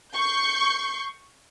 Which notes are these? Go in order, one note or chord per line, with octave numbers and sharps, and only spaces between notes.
C#6 G6 C7